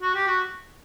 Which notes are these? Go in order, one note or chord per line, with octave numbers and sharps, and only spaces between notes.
F#4
G4
F#4